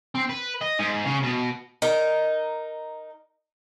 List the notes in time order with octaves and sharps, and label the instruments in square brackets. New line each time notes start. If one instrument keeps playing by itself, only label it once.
[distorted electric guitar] C4
B4
D#5
G#2
C#3
B2
[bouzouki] D#4 A#4